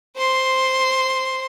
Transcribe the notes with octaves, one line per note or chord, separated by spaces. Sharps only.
C5 C6